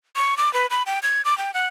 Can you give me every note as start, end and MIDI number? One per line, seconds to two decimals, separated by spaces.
0.16 0.37 85
0.38 0.52 86
0.54 0.66 71
0.71 0.83 83
0.86 0.99 79
1.03 1.22 92
1.25 1.37 86
1.38 1.54 79
1.54 1.67 78